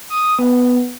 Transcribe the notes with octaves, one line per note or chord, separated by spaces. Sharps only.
D#6
B3